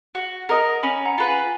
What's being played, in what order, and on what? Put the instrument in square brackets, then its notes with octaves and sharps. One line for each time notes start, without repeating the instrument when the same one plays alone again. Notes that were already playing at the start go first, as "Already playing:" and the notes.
[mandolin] F#4 [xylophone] F#5
[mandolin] A#4 D#5 [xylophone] F#5 A#5
[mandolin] C#4 [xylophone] G#5 B5
[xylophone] F#5 A#5
[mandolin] F4 B4
[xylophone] G#5 B5